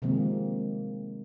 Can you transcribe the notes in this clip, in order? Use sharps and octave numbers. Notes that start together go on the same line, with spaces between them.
C3 D#3 F3 G#3 A#3 C4